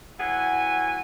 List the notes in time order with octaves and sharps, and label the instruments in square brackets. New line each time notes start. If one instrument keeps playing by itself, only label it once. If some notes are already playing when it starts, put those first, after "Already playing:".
[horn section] E3 F#3 F#5 G#5